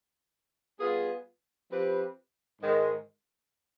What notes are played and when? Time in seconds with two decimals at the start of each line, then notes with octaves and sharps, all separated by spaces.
0.79 G3 B3 F4 G#4
1.70 F3 C4 G4 B4
2.60 G#2 D#3 G#3